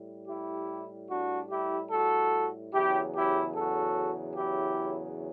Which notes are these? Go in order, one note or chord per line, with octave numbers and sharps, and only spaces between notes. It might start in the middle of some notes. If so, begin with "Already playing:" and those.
Already playing: A2 G3
E4 G4
D4 F#4
E4 G4
F#4 A4
E2 C#3 F#3 E4 G4
E4 G4
F#4 A4
E4 G4